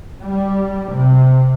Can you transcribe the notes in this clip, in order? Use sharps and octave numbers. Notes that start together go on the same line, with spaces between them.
G3
C3